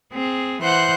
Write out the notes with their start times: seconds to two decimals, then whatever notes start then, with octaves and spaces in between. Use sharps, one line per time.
0.13 C4 G#4
0.62 E3 C5 F#5 C6 F#6 G6